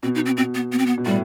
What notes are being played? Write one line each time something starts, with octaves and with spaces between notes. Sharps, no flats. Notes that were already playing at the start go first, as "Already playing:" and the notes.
B2 C4
D#4
C4
B2 C4
B3
B3
C4
B3
B2
A2 G3